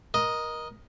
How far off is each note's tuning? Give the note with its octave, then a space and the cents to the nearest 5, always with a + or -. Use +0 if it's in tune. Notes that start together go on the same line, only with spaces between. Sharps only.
A#4 +20 D#5 +0